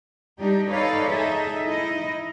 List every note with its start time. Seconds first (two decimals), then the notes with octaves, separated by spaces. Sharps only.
0.39 G3 D4 D#4 G4
0.71 D#4 A4 B4 C#5 D5 F5
1.09 D#4 G#4 A4 E5
1.66 D#4 E4 D#5